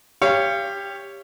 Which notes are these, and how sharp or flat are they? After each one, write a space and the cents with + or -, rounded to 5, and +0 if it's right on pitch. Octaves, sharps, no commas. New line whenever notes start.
G4 +15 C#5 +0 F5 -25